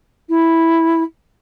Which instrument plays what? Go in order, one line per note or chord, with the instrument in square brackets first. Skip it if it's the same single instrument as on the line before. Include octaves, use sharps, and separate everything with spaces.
[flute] E4